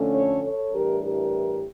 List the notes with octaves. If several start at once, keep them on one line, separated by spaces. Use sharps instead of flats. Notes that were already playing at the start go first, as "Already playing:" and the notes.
Already playing: F2 D3 A3 C#4
A4 C#5
A4 C#5
A2 E3 G3 D4 G4 A#4
G4 A#4